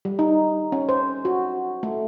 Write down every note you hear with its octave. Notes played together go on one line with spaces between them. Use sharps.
G3
D#4
C#4
C5
F#4
A3